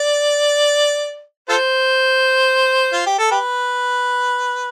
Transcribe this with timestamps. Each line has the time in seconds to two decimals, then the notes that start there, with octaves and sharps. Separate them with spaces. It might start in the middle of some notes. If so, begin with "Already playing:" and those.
Already playing: D5
1.49 F4 A4 C5
2.93 F4
3.06 G4
3.19 A4
3.31 G4 B4